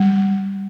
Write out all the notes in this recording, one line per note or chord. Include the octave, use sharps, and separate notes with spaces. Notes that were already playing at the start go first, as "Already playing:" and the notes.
Already playing: G3